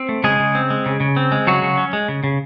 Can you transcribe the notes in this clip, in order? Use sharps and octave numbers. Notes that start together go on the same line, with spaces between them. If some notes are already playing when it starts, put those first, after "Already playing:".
Already playing: C4
A3
C#3 G#3 G#4
C#3
C4
G#3
C#3
C#3
C4
G#3
C#3 F#3 F#4
C#3
C#4
G#3
C#3
C#3